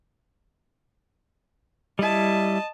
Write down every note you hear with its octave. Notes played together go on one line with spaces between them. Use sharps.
G3 E4 D#5 A5